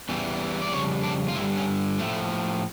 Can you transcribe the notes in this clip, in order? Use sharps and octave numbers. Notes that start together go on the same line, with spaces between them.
E2 E3 G3
D5
F2 C#3 G3 C#5
D4
F4
G2 D3 G3 E4
C#4
A2 F3 A3